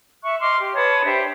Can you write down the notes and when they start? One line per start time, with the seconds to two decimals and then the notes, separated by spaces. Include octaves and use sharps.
0.23 E5 C#6 F#6
0.40 D#5 C6 D6 F6
0.59 G4
0.74 B4 C#5 A5 D#6
1.04 D4 G4 C5 E5